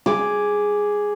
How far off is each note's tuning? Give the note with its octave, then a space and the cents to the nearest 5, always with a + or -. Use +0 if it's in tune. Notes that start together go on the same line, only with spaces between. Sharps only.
G#4 +0 D6 +0